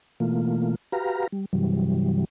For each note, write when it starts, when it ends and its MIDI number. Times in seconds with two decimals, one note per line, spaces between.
0.20 0.75 47
0.20 0.75 52
0.20 0.75 57
0.20 0.75 58
0.20 0.75 65
0.92 1.27 66
0.92 1.27 67
0.92 1.27 71
0.92 1.27 77
0.92 1.27 82
1.32 1.45 55
1.53 2.25 43
1.53 2.25 48
1.53 2.25 52
1.53 2.25 54
1.53 2.25 55